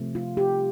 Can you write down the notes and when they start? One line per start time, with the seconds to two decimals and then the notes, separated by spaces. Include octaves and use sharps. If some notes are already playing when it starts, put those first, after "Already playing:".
Already playing: C3 F3 A3
0.15 F4
0.37 G4